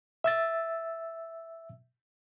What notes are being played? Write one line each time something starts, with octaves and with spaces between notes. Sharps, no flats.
E5 E6 A6